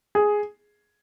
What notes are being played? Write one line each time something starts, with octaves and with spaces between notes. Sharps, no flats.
G#4